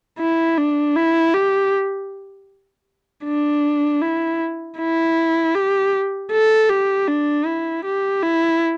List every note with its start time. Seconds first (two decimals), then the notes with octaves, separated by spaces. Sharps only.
0.19 E4
0.58 D4
0.96 E4
1.34 G4
3.25 D4
4.02 E4
4.78 E4
5.55 G4
6.32 A4
6.69 G4
7.08 D4
7.46 E4
7.85 G4
8.23 E4